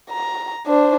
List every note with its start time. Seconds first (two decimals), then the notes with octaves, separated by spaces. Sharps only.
0.10 A#5
0.67 D4 C5